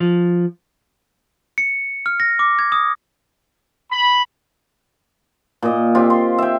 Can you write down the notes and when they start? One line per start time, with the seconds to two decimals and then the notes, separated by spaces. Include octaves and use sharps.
0.01 F3
1.58 C#7
2.06 F6
2.20 A#6
2.39 D6
2.59 G#6
2.72 D#6
3.92 B5
5.62 A#2 D#5
5.95 C4 F4 G4
6.10 C6
6.38 E5 G5